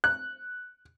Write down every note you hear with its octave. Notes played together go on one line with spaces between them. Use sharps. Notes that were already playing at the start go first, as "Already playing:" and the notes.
F#6